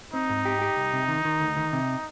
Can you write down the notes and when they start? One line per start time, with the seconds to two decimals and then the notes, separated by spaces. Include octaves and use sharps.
0.13 C4 D#4
0.29 G#2
0.45 G4
0.62 G4
0.77 C2
0.93 C3
1.08 D#3
1.25 D#3
1.40 D2
1.57 D#3
1.72 C3